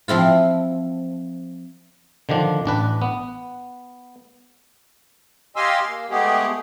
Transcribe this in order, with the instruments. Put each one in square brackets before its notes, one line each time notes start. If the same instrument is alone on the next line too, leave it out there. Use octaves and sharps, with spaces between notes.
[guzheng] F3 C4 E4 F4
[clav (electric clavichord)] D3 D#3 F3 D4
A1 D4 B4
B3
[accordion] G4 D#5 F5 G#5 C6 E6
A#3
G#3 A3 B3 G4 G#4